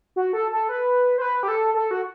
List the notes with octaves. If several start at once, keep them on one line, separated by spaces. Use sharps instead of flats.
F#4
A4
A4
B4
C5
B4
G4
A4
A4
F#4